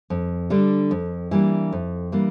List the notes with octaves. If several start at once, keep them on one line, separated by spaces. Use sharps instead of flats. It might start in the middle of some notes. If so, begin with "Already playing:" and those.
F2
D3 G3 D4
F2
E3 G3 A#3 D4
F2
E3 G3 A#3 D4